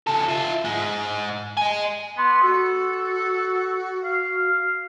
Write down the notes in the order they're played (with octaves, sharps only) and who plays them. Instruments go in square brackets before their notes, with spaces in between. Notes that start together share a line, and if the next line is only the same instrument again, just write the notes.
[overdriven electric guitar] C#3 A4
F4 E5
G#2 G#3
D#5 G#5
[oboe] B3 [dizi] C6
[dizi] F#4 [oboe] A4
[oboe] F5